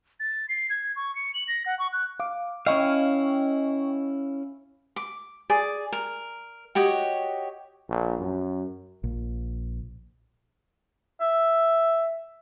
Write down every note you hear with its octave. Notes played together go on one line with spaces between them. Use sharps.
A6
C7
G#6
C#6
C#7
F#7
A#6
F#5
C#6
F#6
F5 D6
C#4 E4 D#5 F5 G5 C#6
D6
G#4 D5
A#4
F#4 G4 C#5 D#5
A#1
F#2
A#1
E5